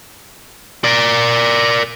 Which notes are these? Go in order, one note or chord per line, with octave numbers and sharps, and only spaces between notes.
A#4 D5